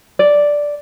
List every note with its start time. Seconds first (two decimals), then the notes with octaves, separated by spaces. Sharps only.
0.19 D5